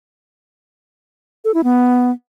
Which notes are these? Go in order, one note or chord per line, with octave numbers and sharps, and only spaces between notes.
A4
E4
B3